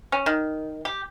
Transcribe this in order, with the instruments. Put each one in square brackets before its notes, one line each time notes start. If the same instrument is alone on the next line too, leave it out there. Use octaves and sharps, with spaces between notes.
[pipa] C#4
D#3
G4